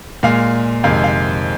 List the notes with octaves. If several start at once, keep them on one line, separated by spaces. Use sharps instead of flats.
A#2 G#3 F5
F2 C3 D#3 G#3 F5
G#5
F5